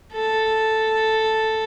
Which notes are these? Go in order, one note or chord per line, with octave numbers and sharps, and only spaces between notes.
A4